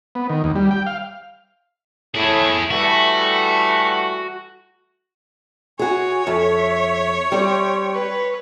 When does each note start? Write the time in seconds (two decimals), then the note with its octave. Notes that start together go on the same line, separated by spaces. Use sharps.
0.15 B3
0.30 D#3
0.44 D#2
0.56 G3
0.71 G5
0.87 F5
2.15 A2 E4 G#4
2.71 E3 G3 A3 F#4
5.79 F#4 G#4 C#5 G#5
6.27 F2 E5
7.32 G3 C4 G5
7.94 B4